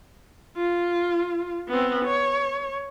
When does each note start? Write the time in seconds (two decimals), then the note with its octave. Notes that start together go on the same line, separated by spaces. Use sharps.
0.57 F4
1.68 B3 C4
2.05 C#5